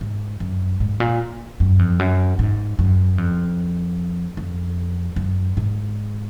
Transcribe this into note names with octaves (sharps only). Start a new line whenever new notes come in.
G#2
F#2
G#2
A#2
F#2
F2
F#2
G#2
F#2
F2
F2
F#2
G#2